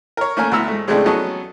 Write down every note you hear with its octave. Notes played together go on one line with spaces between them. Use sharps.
A#4 C#5
A3 A#3 C#4 A#4 G#5
D2 B3 E4 A#5 E6
G#2 A3
A2 C#3 G#3 A3 C4 D4
F#3 B3 C#4 A4 D#5